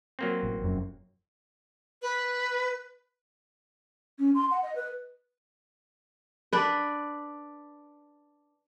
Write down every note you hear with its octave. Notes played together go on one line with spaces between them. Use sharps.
F#3 A#3 C4
A1
F1 F#2
B4
C#4
C6
F#5
D#5
B4
D4 B4